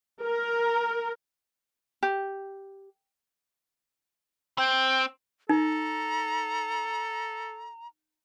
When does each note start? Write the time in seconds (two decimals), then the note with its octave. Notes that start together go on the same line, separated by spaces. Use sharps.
0.23 A#4
2.03 G4
4.58 C4 G5
5.49 D#4 A4 A#5